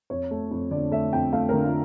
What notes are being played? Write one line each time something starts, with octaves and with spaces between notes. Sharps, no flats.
F2 C#5
A3
F2
D3 D5
A3 E5
F2 G5
A3 F5
D3 A#4
F4